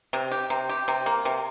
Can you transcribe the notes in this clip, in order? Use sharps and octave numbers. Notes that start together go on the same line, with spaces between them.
C3
G4
C3
G4
C3
A#3
C3